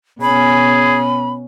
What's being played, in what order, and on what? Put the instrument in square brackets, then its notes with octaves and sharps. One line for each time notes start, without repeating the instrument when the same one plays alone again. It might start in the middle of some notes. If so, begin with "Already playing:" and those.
[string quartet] B2 C#4 [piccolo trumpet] G#4 [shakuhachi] B5